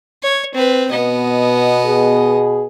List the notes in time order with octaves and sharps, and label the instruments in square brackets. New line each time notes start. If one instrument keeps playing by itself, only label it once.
[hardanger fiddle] C#5
C4 B4
[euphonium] B2 [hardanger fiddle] B3 D#5
[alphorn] G#4